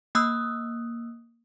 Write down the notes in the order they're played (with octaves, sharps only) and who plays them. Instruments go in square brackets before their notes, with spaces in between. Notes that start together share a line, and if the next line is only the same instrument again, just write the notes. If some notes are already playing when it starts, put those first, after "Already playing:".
[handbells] A#3 D#6 E6 F#6